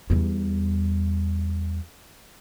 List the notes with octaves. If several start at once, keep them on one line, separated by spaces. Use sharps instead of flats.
E2 G3